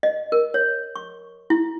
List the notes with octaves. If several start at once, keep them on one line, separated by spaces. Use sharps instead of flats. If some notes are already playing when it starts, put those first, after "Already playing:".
D#5
A#4
C#5
C#6
E4